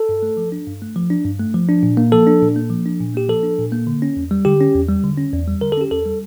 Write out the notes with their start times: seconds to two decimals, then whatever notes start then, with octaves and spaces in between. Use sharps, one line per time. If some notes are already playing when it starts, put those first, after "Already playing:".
Already playing: A4
0.09 G2
0.22 A3
0.37 F3
0.52 D4
0.67 G2
0.82 A3
0.96 F3
1.10 D4
1.25 G2
1.40 A3
1.54 F3
1.69 D4
1.83 A#2
1.97 A#3
2.12 F3 A4
2.27 D4
2.42 A#2
2.56 A#3
2.70 F3
2.85 D4
3.00 A#2
3.14 A#3 G4
3.28 F3 A4
3.43 D4
3.58 A#2
3.72 A#3
3.87 D3
4.02 C#4
4.17 E2
4.31 G3
4.45 D3 G4
4.61 C#4
4.75 E2
4.89 G3
5.04 D3
5.18 C#4
5.33 E2
5.48 G3
5.61 D3 A#4
5.72 A4
5.77 C#4 G4
5.91 E2 A4
6.06 G3